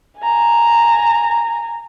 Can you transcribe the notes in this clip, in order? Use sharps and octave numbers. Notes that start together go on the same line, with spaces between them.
G#5 A#5